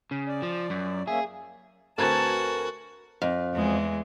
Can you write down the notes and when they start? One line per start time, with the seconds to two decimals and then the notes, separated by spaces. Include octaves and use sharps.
0.11 C#3
0.28 D5
0.42 F3
0.70 F#2
1.07 A#3 C#4 G#4 E5
1.98 D2 C4 F#4 A#4 B4 G#5 A5 G#6
3.22 F2
3.54 E2 G#3